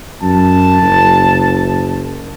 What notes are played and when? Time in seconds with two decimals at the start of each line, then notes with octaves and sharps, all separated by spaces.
0.22 F#2 A5
0.82 F#1